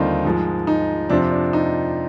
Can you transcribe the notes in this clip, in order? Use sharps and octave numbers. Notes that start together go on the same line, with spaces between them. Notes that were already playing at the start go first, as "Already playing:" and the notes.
Already playing: D#2 D3 G3 C4 D#4 F4
G#2 F3 G#3
D#4
F2 C3 F3 C4 D4
D4
D#4